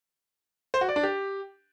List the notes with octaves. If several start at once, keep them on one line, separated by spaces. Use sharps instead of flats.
C5
F#4
D5
D4
G4